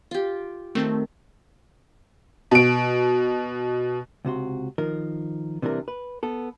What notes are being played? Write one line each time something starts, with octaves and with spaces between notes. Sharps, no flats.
F4 G4
D#3 A3 C4 A5
B2 D7
C#2 C3 F#4 C6
D#3 F3 A#4
C3 E3 G3 D4 A#4
B4
B3 A4